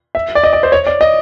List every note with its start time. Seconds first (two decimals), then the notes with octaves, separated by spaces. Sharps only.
0.15 E5
0.35 D5
0.43 D#5
0.53 D5
0.63 C5
0.72 C#5
0.87 D5
1.01 D#5